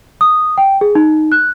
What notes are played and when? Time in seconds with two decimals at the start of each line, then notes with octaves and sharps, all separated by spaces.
0.21 D#6
0.58 G5
0.81 G#4
0.95 D#4
1.32 F#6